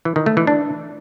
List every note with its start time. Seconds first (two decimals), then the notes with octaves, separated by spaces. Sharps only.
0.05 E3
0.16 D#3
0.26 A3
0.37 E3
0.47 D4